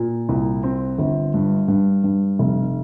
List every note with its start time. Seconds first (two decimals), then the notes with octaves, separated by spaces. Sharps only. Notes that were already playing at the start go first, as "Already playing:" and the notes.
Already playing: A#2
0.29 C2
0.64 C4
0.98 G1
1.34 G2
1.68 G2
2.04 G2
2.39 F1